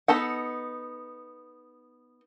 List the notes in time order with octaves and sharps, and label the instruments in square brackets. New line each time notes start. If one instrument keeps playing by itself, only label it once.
[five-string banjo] B3 D#4 A4 F#5